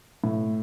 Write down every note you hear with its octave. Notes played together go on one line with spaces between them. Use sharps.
A2